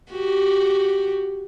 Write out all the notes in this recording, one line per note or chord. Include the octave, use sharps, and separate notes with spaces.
F#4 G4